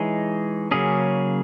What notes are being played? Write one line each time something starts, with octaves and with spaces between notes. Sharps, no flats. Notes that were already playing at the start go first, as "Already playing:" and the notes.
Already playing: E3 G#3 D#4 G#4 C#5
C#3 F#3 A#3 C#4 G#4